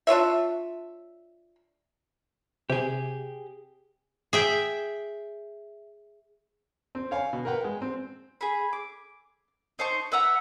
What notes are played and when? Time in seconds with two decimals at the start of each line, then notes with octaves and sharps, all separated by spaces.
0.07 D4 F4 C#5 E5
2.70 C3 G4 G#4
4.33 G#4 E5 G5
6.95 C4
7.11 C#5 F5 G#5
7.33 B2
7.45 A#4 B4 F#5 G5
7.64 G#3
7.82 C4
8.41 G#4 B5
8.73 D6
9.79 D#4 C5 A5 C#6
10.12 B4 E5 F#5 A#5